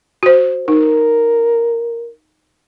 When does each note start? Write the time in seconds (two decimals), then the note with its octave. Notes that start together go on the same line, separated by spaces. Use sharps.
0.23 F#4 C5
0.68 D#4 A#4